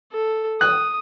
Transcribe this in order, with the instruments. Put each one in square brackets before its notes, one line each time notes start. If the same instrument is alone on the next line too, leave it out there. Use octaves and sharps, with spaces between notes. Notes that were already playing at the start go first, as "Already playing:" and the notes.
[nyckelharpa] A4
[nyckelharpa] D#6 [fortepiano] F#6